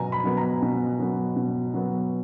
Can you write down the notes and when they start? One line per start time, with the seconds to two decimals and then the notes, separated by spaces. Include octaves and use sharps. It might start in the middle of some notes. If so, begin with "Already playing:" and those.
Already playing: B2 F#3 B3 G#5 A#5
0.12 B5
0.24 F#3 B3
0.37 A#5
0.62 B2
0.99 F#3 B3
1.36 B2
1.74 F#3 B3